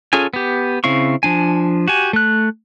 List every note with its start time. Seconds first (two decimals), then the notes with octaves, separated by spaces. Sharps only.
0.13 C#4 F4 G#4 A4 G#5
0.34 B3 G4
0.84 C#3 C4 E4 F5 C#6
1.23 F3 D4 G#5
1.88 F#4 G4 G#5
2.13 A3 F#6